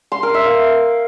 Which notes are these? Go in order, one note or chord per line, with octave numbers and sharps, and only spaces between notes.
C6
A#4
E5
F5